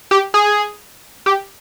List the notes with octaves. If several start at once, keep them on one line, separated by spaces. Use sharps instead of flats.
G4
G#4
G4